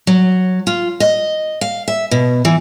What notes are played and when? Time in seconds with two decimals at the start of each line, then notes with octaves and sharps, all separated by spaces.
0.07 F#3
0.67 F4
1.00 D#5
1.61 F5
1.88 E5
2.11 B2
2.45 E3